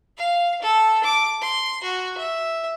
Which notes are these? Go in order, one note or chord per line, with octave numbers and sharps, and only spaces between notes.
F5
A4
D6
C6
F#4
E5